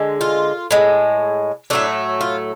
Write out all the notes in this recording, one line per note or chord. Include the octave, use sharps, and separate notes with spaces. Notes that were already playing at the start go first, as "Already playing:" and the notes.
Already playing: D3 G#3
F4
A2 G#3
A2 F#3 A3 D4
F4